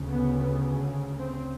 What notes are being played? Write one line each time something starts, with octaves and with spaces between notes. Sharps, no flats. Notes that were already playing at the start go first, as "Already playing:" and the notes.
Already playing: D2 C#3
B3
C4